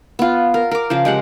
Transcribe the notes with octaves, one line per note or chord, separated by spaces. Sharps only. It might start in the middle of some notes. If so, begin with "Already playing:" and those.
B3 F4
A#4
A#4 D6
C#3 F3 C5
G#3 G4 F#5